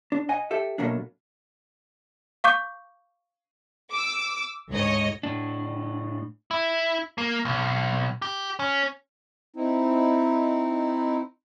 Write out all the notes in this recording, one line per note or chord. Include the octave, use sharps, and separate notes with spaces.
D4
D#5 F#5 G#5
G4 A4 E5
B2 F#3 A3 A#3 D4
F5 C#6 D6 G6
D6 E6
D2 G#2 C#5 D#5
A2 D4
E4
A#3
B1
G4
C#4
C4 D#4 E4